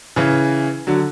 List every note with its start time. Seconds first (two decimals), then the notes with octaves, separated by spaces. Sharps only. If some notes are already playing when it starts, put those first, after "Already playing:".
0.16 C#3 E3
0.87 D3 F#3